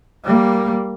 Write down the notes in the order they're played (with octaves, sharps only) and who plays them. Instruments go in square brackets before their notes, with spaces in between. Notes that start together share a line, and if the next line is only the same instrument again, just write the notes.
[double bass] G3 A#3